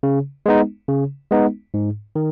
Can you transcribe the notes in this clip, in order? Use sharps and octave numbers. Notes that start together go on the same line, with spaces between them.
C#3
G#3 B3 D#4
C#3
G#3 B3 D#4
G#2
D#3